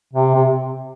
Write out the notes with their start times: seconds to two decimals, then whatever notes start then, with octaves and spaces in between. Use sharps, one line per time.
0.14 C3
0.35 C3